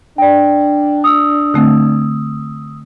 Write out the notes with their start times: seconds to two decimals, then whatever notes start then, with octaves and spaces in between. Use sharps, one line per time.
0.18 D4 D5 G5
1.04 D#6 E6
1.54 D3 A3 C4